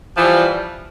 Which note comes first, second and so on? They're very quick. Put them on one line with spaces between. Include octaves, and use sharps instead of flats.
F3 E3 G3